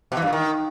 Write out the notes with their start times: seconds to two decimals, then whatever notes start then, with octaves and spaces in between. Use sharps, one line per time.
0.12 B2
0.17 E3
0.22 G2
0.27 A#2
0.33 D#3